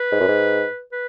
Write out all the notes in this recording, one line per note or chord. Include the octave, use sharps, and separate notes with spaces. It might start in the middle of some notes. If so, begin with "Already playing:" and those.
Already playing: B4
G#2
F#2
G#2
B4